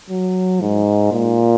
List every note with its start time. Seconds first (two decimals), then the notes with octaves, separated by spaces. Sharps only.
0.10 F#3
0.61 G#2
1.12 A#2